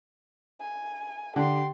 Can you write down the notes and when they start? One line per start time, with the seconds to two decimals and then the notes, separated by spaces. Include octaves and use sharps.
0.61 G#5
1.36 D3 G4 C6